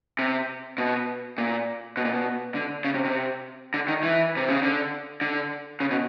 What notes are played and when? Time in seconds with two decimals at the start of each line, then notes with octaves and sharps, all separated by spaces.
0.19 C3
0.78 B2
1.38 A#2
1.97 B2
2.05 A#2
2.13 B2
2.55 D3
2.84 C#3
2.94 C3
3.05 C3
3.74 D3
3.88 D#3
4.03 E3
4.37 C3
4.49 C#3
4.62 D3
5.21 D3
5.80 C#3
5.91 B2